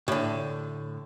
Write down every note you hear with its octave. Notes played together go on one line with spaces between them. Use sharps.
A2 D3